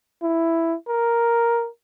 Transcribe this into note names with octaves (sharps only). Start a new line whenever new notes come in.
E4
A#4